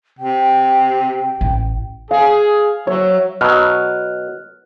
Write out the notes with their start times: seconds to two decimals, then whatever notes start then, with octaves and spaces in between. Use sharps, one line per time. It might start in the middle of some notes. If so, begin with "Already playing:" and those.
0.19 C3 G5
1.41 A1
2.11 G#4 F5
2.87 F#3 C#5 E5
3.41 B2 F#3 F6 F#6